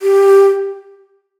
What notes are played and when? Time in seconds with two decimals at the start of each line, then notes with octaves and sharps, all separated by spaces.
0.02 G4